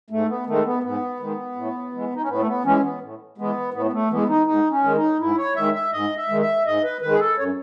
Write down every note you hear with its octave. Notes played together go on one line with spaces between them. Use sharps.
G#2 A3
B3
D#3 G#3 A3
B3
G#2 B3
D#3 G#3
A2
E3 G#3
D#4
C#4
A2 B3
A3
B3
E3 G#3 C#4
B3
A2
E3 G#3 B3
A2 B3
B3
A3
E3 G#3 B3
D#4
G#2 D#4
C#4
D#3 G#3
D#4
G#2 E4
C#5
D#3 G#3 E5
E5
G#2 D#5
E5
D#3 G#3
E5
G#2 D#5
B4
D#3 G#3 B4
G#4
A4
F#2 C#5